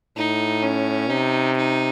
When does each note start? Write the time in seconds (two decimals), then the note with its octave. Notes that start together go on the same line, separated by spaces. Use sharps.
0.17 A2 D#4
0.63 C#4
1.10 C3 D#4
1.57 D#4